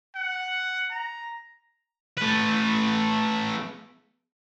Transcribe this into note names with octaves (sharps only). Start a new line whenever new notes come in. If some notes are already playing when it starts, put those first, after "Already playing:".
F#5
A#5
A3 B4